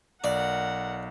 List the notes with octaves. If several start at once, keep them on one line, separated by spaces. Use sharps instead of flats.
B1 A#4 D5 F#5